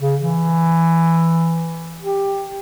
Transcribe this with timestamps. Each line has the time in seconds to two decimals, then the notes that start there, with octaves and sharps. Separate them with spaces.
0.01 C#3
0.21 E3
2.02 G4